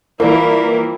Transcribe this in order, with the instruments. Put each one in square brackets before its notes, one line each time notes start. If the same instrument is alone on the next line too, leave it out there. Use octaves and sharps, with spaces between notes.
[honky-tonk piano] E3 A#3 [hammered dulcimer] F3 G3 [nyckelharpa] E4 A#4